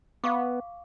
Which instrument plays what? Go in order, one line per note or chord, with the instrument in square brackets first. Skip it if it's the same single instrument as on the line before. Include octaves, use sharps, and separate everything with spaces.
[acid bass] B3 [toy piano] F5 C#6 D6